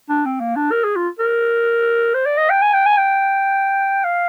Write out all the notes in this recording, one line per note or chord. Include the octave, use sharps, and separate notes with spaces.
D4
C4
A#3
D4
A#4
G#4
F4
A#4
C5
D5
D#5
G5
G#5
G5
G#5
G5
F5